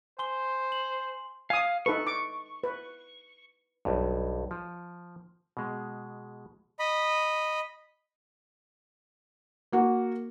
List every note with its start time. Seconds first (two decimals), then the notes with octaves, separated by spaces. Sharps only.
0.19 C5 G#5 C6 G7
0.72 F#7
1.50 F5 G#5 D#6
1.86 D#4 A4 B4 C#6
2.07 D6
2.64 B4
3.85 B1 G2
4.51 F3
5.57 B2 G#3
6.79 D#5 B5
9.72 A#3 F#4